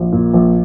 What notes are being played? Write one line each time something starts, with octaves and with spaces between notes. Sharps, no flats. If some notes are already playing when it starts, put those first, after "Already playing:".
Already playing: A#1
A#2
A#1